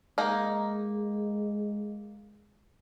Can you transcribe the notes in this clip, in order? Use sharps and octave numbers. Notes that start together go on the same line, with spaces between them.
G#3 A#3 D#4